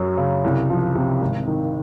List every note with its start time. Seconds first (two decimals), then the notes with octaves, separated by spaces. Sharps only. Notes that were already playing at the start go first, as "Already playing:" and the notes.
Already playing: F#2 F#3
0.18 C#3
0.44 C2
0.70 F3
0.95 C3
1.21 G#1
1.47 D#3